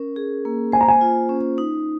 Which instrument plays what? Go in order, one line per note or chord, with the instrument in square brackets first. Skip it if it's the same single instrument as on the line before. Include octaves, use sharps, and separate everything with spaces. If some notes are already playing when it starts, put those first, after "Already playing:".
Already playing: [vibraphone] C#4 A#4
G#4
A#3
[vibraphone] C5 [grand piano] G#5
[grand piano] A#5
G#5
[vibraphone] F4
C#4
D#4